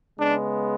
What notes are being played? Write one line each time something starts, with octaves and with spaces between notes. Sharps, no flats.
C#3 G#3 B3 D4